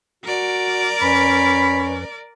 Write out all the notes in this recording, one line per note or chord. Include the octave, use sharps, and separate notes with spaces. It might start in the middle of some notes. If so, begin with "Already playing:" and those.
F#4 A#4 D5
F2 C#4 B4 B5